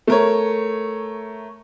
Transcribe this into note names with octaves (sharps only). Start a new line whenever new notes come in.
A3 A#4 C#5